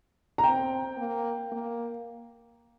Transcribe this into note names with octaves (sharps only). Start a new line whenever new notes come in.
A#5
C4 G5
A#3
A#3